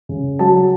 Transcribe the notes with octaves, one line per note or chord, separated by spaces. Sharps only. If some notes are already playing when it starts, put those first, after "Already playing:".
C#3
F#3 A5